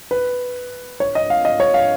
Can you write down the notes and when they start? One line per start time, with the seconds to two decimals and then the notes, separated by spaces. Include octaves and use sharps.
0.11 B4
1.00 C#5
1.15 D#5
1.30 F5
1.45 D#5
1.60 C#5
1.74 F5